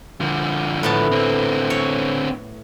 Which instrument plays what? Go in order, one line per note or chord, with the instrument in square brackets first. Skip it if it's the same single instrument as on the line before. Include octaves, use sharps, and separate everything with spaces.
[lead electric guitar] D3 F3
[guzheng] A2 B3 A5
[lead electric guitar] D3 C4
[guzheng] C#5